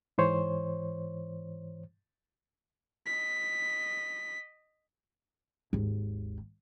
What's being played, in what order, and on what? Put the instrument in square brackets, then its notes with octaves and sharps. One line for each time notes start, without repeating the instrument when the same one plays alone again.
[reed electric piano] G#2 E3 C5 C#5
[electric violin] D#5 B6
[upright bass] G#1 D#2